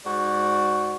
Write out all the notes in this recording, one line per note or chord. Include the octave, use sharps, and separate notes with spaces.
G#2 F#4 D5